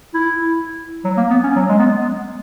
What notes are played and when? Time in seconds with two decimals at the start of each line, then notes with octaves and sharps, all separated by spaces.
0.14 E4
1.04 F#3
1.17 A#3
1.30 B3
1.43 C#4
1.56 F#3
1.69 G#3
1.79 B3